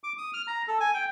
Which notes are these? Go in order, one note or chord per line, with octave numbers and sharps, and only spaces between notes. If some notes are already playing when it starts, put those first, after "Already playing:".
D6
D#6
F6
A#5
A4
G#5
G5